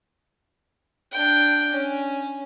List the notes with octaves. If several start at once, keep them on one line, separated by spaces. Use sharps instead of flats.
D4 G5
C#4